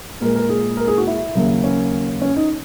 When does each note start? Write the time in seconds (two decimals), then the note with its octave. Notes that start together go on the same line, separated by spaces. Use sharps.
0.21 A#2 G#3 A#4
0.36 A#4
0.49 G#4
0.77 A#4
0.88 G#4
0.98 F#4
1.07 E4
1.35 D#2 C#3 F#3 A#3
1.64 C#4
2.22 C#4
2.36 D#4